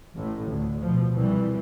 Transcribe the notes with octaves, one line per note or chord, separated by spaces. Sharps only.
A1 A2
D2
B2 F3
C2 E3 G3